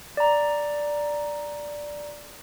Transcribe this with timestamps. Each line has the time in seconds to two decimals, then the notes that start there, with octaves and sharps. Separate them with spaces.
0.17 D5 A#5